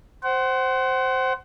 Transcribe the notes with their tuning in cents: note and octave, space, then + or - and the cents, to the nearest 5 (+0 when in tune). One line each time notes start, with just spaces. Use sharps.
C5 +0 F#5 +30